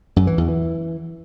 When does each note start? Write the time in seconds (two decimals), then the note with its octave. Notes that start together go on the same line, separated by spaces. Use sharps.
0.16 F#2
0.27 E3
0.38 E2
0.48 E3